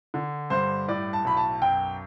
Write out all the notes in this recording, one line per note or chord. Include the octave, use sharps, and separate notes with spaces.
D3
G2 C5
A2 D5
A5
B1 B5
A5
F#2 G5